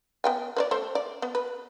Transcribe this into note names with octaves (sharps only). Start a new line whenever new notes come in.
B3 G5 G#5
B4 C5 D5
A3 C5
D5
B3
B4